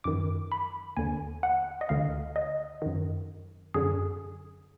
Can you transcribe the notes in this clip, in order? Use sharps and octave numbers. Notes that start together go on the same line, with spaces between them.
F#2 D#3 D6
B5
D#2 D3 G#5
F#5
D#5
D2 D3 F5
D#5
F#2 D#3
F#2 D3 G#4